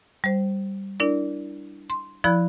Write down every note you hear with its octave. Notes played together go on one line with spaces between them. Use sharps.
G3 C5
D4 E4 A#4 D5
C6
F3 E4 D5 B5 F#6 G#6